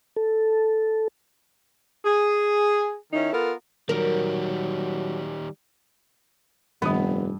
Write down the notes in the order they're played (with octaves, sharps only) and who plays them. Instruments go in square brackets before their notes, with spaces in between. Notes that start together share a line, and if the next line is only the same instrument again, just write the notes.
[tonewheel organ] A4
[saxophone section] G#4
D#3 C#4 D#4 E4
B3 F4 A4 A#4
[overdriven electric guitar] D#3 G3 [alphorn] F#3 [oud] A#4
[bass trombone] F1 [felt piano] G2 [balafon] D#3 G3 [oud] B3